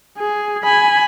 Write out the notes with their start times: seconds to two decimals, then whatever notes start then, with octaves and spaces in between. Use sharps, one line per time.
0.19 G#4
0.64 G#5 B5